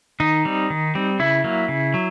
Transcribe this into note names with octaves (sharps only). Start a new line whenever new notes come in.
D#3 D#4
G3 C4
D#3
G3 C4
C#3 E4
F#3 A#3
C#3
F#3